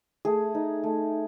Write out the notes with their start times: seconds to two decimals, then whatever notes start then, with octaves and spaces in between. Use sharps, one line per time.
0.25 A3 G#4
0.55 D#4
0.84 A3